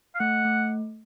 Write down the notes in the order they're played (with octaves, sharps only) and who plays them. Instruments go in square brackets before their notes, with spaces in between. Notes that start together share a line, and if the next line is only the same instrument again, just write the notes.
[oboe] F5
[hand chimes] A3 [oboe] F#5
[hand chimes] A3